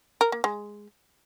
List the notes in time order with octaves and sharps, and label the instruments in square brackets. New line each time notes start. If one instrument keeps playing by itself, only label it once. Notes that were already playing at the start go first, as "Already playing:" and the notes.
[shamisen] A#4
A#3
G#3